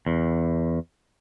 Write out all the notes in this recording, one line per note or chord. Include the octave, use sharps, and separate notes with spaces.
E2